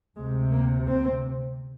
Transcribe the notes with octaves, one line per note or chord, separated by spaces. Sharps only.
D2 C3 G#3
A#3
C4